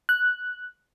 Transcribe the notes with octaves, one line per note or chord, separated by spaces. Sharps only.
F#6